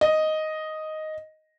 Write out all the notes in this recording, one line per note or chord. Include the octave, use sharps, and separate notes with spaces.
D#5